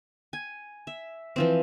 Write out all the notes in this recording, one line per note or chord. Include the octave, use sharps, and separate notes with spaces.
G#5
E5
E3 F3 C4